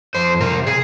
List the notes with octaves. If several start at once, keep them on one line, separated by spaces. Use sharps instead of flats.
F2 C5
C3 A#4
G#4